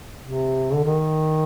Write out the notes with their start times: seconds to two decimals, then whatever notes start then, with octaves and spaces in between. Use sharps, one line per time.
0.24 C3
0.74 D3
0.84 D#3